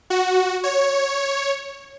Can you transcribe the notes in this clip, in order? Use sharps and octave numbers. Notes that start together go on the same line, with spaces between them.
F#4
C#5